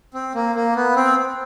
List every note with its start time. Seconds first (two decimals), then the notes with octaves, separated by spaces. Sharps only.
0.14 C4
0.35 A#3
0.55 A#3
0.75 B3
0.96 C4